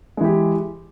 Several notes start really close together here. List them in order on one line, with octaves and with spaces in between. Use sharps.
G#3 E3 G4